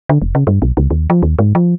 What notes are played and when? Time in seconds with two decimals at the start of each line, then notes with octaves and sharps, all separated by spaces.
0.09 D3
0.22 F1
0.35 C#3
0.47 G2
0.62 B1
0.77 C#2
0.90 D#2
1.10 F3
1.23 D#2
1.39 G#2
1.55 F3